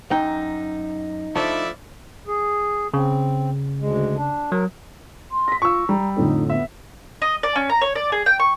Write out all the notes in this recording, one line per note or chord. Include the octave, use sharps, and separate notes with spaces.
F#2 D#4 G5
F3 A3 D4 E4 D5 E5
G#4
C#3 C4
D2 G#3
D4
F#3 A#4
C6
A#6 B6
F4 C#6 E6
G3 A#5
F2 A2 D3 D#4
B3 E5
D#5
D5
C#4
A#5
C#5
D5
G#4
G5
C#6